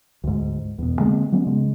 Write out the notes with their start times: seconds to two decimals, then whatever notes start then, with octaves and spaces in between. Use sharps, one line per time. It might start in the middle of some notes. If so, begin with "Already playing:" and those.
0.24 D2 G#2
0.78 E2 B2
0.99 D3 G#3 A#3 C4
1.32 F#3 G3 B3 C#4
1.47 C#3 G#3